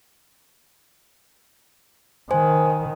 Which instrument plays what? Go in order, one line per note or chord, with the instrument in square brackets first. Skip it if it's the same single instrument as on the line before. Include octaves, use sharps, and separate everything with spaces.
[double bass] D#3 [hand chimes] C5 G#5